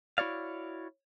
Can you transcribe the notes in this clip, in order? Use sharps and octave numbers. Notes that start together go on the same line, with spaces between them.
E4 F#4 C#5 D5 F5